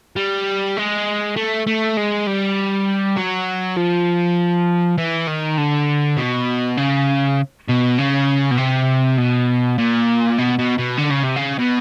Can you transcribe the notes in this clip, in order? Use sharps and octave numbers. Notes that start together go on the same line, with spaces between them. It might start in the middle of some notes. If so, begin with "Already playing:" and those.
G3
G#3
A3
A3
G#3
G3
F#3
F3
E3
D#3
D3
B2
C#3
B2
C#3
B2
C3
B2
A#2
B2
B2
B2
D3
C#3
C3
C#3
B2